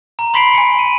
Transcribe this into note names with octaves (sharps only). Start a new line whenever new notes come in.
A#5
B5 C6 B6 C7 D7 F#7
G#5 C6 B6 C#7
D#7